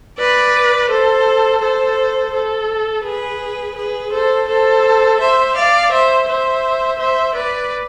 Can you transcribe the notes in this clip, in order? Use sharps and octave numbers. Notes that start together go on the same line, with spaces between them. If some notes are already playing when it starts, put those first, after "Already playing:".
B4 D5
A4 C5
A4 C5
A4
G#4 B4
G#4 B4
A4 C5
A4 C5
C5 E5
D5 F5
C5 E5
C5 E5
C5 E5
B4 D5